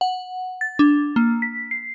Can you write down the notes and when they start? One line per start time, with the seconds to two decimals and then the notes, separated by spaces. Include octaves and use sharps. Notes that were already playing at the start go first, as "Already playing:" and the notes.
0.01 F#5
0.61 A6
0.79 D4
1.16 A#3
1.42 B6
1.71 C7